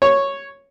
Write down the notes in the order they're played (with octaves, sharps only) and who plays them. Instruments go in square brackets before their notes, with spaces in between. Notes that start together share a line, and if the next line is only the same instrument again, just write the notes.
[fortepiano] C#5